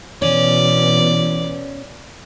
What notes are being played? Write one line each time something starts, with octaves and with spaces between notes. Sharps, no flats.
B2 E3 C#4 D5